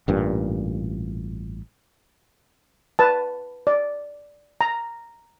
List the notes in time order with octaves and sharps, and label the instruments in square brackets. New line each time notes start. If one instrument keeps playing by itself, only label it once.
[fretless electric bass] A1 G2 A#2
[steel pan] B4 A5
D5
A#5